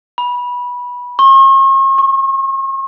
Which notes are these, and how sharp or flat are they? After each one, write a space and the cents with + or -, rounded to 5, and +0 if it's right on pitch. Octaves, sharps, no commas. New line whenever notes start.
B5 -15
C#6 -45
C#6 -10